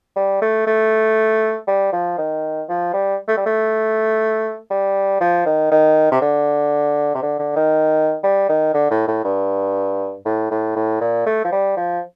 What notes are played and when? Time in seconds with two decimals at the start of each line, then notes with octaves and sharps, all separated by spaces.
0.16 G3
0.42 A3
0.67 A3
1.68 G3
1.92 F3
2.18 D#3
2.69 F3
2.93 G3
3.28 A3
3.37 G3
3.46 A3
4.70 G3
5.21 F3
5.46 D#3
5.71 D#3
6.12 C3
6.21 D3
7.15 C3
7.22 D3
7.39 D3
7.56 D#3
8.23 G3
8.49 D#3
8.74 D3
8.91 A2
9.08 A2
9.24 G2
10.25 A2
10.51 A2
10.76 A2
11.01 A#2
11.26 A3
11.45 F3
11.52 G3
11.77 F3